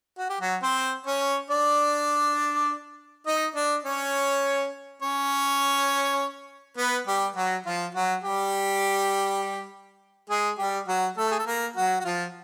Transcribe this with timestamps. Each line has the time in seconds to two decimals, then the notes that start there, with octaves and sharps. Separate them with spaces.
0.19 F#4
0.29 G4
0.41 F#3 F#4
0.63 C4 C5
1.06 C#4 C#5
1.50 D4 D5
3.26 D#4 D#5
3.55 D4 D5
3.85 C#4 C#5
5.02 C#4 C#5
6.77 B3 B4
7.07 G3 G4
7.36 F#3 F#4
7.66 F3 F4
7.94 F#3 F#4
8.24 G3 G4
10.30 G#3 G#4
10.59 G3 G4
10.88 F#3 F#4
11.17 A3 A4
11.31 G#4
11.39 A4
11.47 A#3 A#4
11.76 F#3 F#4
12.00 F#4
12.05 F3 F4